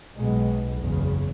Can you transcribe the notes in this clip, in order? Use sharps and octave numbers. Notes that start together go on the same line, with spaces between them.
B1 B2 G#3
F#1 E2 C#3